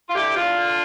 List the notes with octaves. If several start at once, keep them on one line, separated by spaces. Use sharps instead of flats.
F4
D3 E4 G4
E4
E2 D4 F4
D3